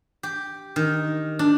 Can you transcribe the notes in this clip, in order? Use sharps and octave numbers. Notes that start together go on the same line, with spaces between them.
G4
D#3
D4